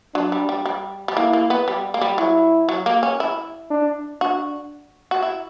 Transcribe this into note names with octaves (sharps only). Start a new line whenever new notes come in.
F#3 D4
G3
G3
G3
G3
A#3 E4
A#3
B3
G3
A#3
G3
F#3 E4
F#3
A#3
C#4
E4
D4
D4 F#4
F#4
E4